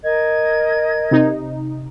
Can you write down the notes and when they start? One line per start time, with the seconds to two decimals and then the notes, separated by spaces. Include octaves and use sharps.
0.04 A#4 D#5 G#6
1.11 C3 D#4